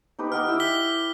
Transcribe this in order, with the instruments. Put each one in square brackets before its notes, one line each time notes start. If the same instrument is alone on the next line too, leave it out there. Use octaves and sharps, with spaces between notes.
[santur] D#4 G4 B4
[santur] D#5 F#5 D6 [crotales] F6
[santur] E4 G4 E6
[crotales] B6 G7